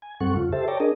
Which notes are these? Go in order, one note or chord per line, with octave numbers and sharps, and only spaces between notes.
G#5
F#2 G3 C4 A4 F#5 C#6
F2 C#3 F4
G4 A4 C5 E5 A5
C#5 D5 G5 A5 A#5
D4 G#4 A#4 D#5